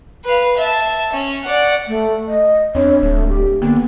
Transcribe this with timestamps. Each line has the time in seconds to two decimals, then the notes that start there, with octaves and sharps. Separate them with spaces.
0.25 B4 F5
0.57 E5 A5
1.13 C#4
1.44 D5 F#5
1.88 A3
2.28 D#5
2.75 E2 C4 D4 C#5
3.02 D1 A3
3.29 G4
3.62 D3 A#3 B3